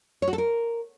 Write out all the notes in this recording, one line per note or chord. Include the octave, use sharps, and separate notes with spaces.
C#5
F#4
A4
A#4